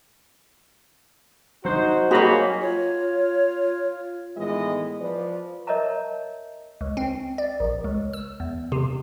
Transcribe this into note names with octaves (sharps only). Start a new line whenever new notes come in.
F#3 D#4 F#4 C5
A#3 F#4 G#4 C#5 D#5 B5
F4 C#5
A2 D#3 E3 G#3 B3 D#5
F3 B4 D5
A#4 C#5 D#5 E5 A5 A#5
C#2
C4
D5
A#1
C#2
E6
E2
C3